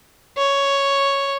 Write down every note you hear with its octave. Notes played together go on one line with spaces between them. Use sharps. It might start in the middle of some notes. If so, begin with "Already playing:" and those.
C#5